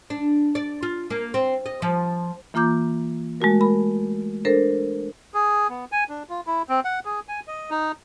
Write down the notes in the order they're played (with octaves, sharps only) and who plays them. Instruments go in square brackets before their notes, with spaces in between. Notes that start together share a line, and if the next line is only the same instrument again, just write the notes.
[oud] D4
D5
F4
A#3
C4
D#5
F3
[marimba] E3 A#3 F4 A#5 D6 G6
G#3 A3 F#4 A#4
A#4 B5
D4 A4 A#4 C5
[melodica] G#4
B3
G#5
D4
F4
E4
C4
F#5
G#4
G#5
D#5
D#4